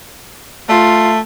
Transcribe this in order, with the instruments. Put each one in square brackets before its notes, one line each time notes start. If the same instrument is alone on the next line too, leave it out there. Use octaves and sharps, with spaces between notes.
[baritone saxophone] A3 [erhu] F4